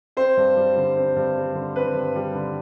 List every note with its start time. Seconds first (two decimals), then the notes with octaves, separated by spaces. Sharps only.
0.17 C4 C5
0.37 G2
0.57 G3
0.77 D3
0.97 C4
1.16 G2
1.36 G3
1.55 D3
1.76 C4 B4
1.95 G2
2.16 G3
2.35 D3